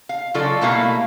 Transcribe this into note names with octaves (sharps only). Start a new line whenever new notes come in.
F5
C#3 F#3 F4 A4 D5
B2 G3 A3 A#3 E4 F5